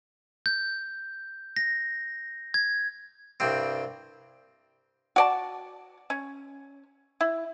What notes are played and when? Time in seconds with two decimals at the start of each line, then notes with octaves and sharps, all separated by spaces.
0.46 G6
1.56 A#6
2.54 G#6
3.40 C2 G2 C4
5.16 F#4 D5 A5
6.10 C#4
7.21 E4